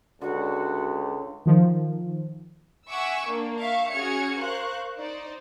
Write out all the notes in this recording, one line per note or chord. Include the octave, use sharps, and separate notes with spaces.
C#2 D3 F#4
D#3 F3
E5 F#5 G#5 C#6 D6 E6
A#3 D4
E5 F5 C#6
C#4 F#4 G#4 F6 G#6 C#7
A#4 C5 F5 C#6 F#6
D#4 C5 D5